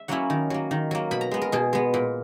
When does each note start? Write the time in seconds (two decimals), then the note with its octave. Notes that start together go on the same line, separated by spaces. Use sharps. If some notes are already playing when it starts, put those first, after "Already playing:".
Already playing: E5
0.08 F#3 A#3 C#4 E4 F#5
0.30 D#3
0.50 F#3 A#3
0.71 D#3
0.91 F#3 A#3
1.11 B2 B5
1.21 A#5
1.31 G#3 B3
1.42 A#4
1.52 B2 G#4
1.73 G#3 B3
1.94 A#2